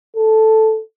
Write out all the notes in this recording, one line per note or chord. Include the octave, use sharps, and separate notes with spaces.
A4